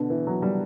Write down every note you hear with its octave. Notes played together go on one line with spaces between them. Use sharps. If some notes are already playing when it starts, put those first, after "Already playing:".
Already playing: B2 D3
E3
F#3
G3